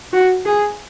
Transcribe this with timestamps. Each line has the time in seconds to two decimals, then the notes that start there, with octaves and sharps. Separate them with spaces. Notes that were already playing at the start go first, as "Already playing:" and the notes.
0.13 F#4
0.46 G#4